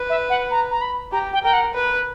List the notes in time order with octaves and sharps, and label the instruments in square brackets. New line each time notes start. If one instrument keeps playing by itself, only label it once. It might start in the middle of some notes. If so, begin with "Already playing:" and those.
Already playing: [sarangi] B4
[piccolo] E5
F#5
A#5
A#5
B5
[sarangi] G4 [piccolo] A#5
[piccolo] G5
[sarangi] A#4 [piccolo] G5
[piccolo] F#5
[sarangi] B4